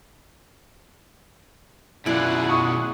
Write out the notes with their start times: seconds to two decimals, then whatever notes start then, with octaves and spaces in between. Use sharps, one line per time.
2.06 F#2 B2 E4 F4 G#4 D5 F#5
2.49 C#6 D#6